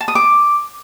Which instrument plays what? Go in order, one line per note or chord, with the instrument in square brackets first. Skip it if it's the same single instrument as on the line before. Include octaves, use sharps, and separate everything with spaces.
[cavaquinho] A5
D#6
D6